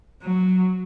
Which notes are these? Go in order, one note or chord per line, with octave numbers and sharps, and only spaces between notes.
F#3